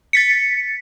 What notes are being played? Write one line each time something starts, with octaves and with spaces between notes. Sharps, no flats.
A6 B6 C#7